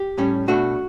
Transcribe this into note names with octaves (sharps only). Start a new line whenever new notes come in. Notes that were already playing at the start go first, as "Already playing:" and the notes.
Already playing: G4
A2 G3 C#4
B2 A3 D4 F#4